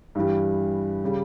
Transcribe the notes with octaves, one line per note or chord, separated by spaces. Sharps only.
G2 E3 G3
C#3 G3